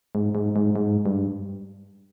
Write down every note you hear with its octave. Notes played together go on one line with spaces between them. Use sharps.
G#2
G#2
G#2
G#2
G2